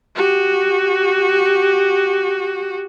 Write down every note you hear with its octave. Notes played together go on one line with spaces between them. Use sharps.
F#4 G4